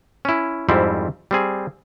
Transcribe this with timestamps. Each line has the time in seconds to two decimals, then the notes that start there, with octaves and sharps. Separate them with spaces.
0.25 C#4 E4
0.69 F2 G#2 G3 C4 E4
1.31 G3 C4 G#4